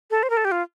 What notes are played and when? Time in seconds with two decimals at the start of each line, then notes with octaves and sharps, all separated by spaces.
0.11 A4
0.23 C5
0.30 A#4
0.37 A4
0.45 G4
0.52 F4